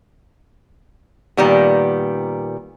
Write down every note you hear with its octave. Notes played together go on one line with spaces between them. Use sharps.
A#2 D#3 G3 B3